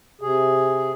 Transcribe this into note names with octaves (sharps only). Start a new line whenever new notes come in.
C3 G#4